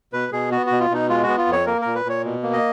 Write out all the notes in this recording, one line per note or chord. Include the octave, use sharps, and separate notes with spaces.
B2 B4
B2 G#4
B3 F#4
B2 F#4
F4
B2 D#4
G#3 F4
F#4
B3
F4
F2
C#5
A#3 A#4
A#2 A#4
B4
A#2 C#5
B2
A#3
D#5